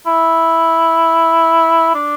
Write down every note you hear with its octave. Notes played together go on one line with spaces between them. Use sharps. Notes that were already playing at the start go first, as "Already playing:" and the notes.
E4
D4